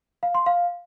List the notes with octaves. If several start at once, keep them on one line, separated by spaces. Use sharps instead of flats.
F5
C6
F5